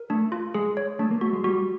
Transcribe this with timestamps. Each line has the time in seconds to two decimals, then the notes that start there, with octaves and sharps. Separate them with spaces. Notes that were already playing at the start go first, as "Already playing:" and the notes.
Already playing: A#4
0.10 A3 D4
0.32 F4
0.54 G#3 G#4
0.77 C#5
0.99 A3 D4
1.11 A#3
1.21 A3 F#4
1.33 G#3
1.44 G3 F#4